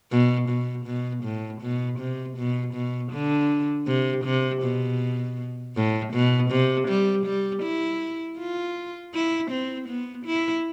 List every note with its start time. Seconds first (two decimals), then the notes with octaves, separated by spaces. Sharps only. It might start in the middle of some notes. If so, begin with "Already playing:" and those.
0.11 B2
0.48 B2
0.86 B2
1.24 A2
1.62 B2
1.99 C3
2.37 B2
2.74 B2
3.12 D3
3.87 C3
4.25 C3
4.62 B2
5.75 A2
6.13 B2
6.50 C3
6.88 G3
7.26 G3
7.63 E4
8.38 F4
9.14 E4
9.51 C4
9.88 B3
10.26 E4